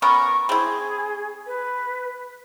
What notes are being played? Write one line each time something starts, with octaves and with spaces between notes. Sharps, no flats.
B3 C#4 A#4 C#6
C4 E4 G#4
B4